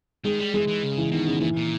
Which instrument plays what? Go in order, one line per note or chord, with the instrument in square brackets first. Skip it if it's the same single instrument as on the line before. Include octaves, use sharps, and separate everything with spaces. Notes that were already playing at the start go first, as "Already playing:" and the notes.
[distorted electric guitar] D#3 [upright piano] G#3
[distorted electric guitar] G3
[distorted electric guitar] E3 [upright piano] G#3
[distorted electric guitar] E3
C#3
[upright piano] E3
[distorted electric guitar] B2 [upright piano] D#3
[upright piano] C#3
[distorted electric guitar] A#2 [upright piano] E3
[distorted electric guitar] A#2